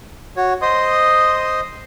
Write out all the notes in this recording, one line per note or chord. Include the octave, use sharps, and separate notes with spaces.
F#4 C#5
C5 D#5 C6 D#6